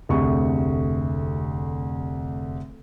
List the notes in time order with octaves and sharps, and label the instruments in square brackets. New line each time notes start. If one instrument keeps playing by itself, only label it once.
[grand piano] F1 D2 C3 G#4 C#6